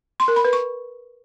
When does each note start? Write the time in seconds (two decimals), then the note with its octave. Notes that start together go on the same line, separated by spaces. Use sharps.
0.20 C6
0.28 A#4
0.36 B5
0.45 B4
0.53 C#6